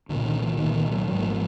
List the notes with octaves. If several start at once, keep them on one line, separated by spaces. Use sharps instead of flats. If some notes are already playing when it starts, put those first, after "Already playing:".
C2 A#2 D3
D#3
E3
C2 A#2 D#3
D#3
F#3
G#1 G#2 F#3
F3